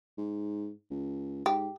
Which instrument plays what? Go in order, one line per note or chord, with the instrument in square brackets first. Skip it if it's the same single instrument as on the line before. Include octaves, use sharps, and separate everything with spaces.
[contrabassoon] G#2
C#2
[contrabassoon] G#2 [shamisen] G4